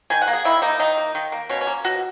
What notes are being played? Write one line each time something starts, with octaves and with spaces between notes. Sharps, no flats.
D#3 G#5
F#5
A#3
G#4
D#3 E4
A#3 D#4
D#3 D#4
A#3
D#3
A#3
B2 C#4
C#4
A#3
B2 F#4